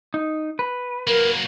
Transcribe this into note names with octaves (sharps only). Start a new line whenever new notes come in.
D#4
B4
F#3 A#3 A#4